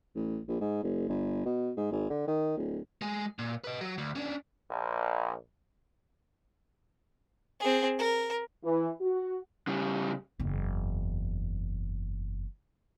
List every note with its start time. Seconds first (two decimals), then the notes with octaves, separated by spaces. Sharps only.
0.15 A1
0.48 A#1
0.61 G#2
0.83 F#1
1.08 G1
1.45 B2
1.77 G#2
1.92 G#1
2.10 D3
2.27 D#3
2.57 D1
3.02 G#3 G#4
3.39 A#2
3.64 B4 D#5
3.81 F#3
3.98 D2
4.16 C#4 D4
4.70 A#1
7.60 C4 G#4
7.99 A#4
8.64 E3
9.01 F#4
9.67 C#3 G3
10.40 F#1 E2